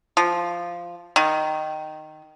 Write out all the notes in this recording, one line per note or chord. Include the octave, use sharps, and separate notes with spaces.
F3
D#3